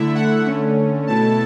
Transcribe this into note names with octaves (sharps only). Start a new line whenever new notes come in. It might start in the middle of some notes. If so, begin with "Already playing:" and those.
Already playing: D3 A3 E4 E5
F#5
D3 A3 C#4
B2 A3 E4 A5